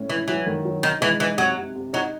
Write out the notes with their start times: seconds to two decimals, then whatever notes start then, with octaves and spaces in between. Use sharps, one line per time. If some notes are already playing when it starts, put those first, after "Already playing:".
Already playing: A2 C#4
0.09 E3 E4
0.28 E3 F#3
0.46 D#3
0.65 F#3
0.83 D#3 D#4
1.01 E3 G#3
1.20 E3 D#4
1.38 C3 F#3
1.57 C3
1.76 C3
1.93 F#3 D#4